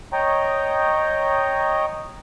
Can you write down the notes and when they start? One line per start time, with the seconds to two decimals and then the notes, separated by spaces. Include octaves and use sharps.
0.13 C#5 D#5 G5 A#5